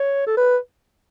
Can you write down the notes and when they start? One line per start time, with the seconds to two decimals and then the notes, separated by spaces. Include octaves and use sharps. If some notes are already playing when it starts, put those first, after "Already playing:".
Already playing: C#5
0.27 A4
0.37 B4